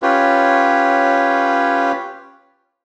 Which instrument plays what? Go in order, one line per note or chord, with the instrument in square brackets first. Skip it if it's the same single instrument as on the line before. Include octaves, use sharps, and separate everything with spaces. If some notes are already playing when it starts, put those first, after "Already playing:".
[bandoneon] C#4 F4 G4 B4 C#5